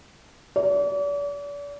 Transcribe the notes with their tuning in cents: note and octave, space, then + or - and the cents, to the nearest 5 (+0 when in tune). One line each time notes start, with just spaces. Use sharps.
D5 -40